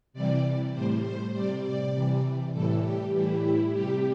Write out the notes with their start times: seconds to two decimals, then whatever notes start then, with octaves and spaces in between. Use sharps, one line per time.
0.13 C3 E3 G3 D5
0.73 A2 G3 C5
1.04 C5
1.33 C3 G3 D5
1.63 D5
1.93 C3 E3 G3
2.53 A2 E3 G3 A4
2.83 G4
3.13 A2 E3 G3 E4
3.43 E4
3.73 C3 G3 G4